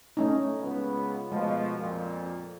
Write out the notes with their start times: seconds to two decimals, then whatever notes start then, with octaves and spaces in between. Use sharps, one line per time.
0.17 A3 C#4 D#4
0.61 C#2 B3
1.32 B2 F3 G#3 A3
1.78 F2 A#2